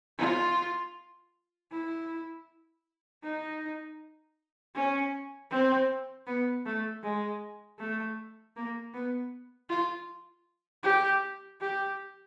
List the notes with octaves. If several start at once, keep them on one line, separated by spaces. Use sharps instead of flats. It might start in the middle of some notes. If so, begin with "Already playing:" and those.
F4
E4
D#4
C#4
C4
B3
A3
G#3
A3
A#3
B3
F4
G4
G4